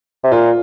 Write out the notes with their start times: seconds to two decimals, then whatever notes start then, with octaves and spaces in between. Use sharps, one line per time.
0.24 C3
0.32 A#2 F4